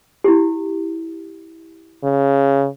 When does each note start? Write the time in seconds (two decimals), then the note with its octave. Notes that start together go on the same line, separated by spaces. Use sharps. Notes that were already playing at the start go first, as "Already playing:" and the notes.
0.24 E4 G4
2.04 C#3